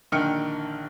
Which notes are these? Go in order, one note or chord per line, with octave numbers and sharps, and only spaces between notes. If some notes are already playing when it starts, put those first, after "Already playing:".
A#1 D3 D#3 G5 F6 C#7